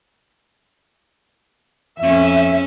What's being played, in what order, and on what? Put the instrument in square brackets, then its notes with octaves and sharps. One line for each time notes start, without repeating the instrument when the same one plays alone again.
[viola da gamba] F2 C#4 [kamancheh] E5